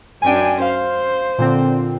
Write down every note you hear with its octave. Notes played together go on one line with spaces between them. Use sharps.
F#2 C#4 D4 G5 G#5
C5 F5
A#2 D3 C4